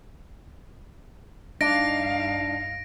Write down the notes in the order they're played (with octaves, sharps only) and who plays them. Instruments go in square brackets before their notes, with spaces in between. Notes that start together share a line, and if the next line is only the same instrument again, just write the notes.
[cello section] G2 D#4 F5 [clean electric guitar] D4 [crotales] A#6 D7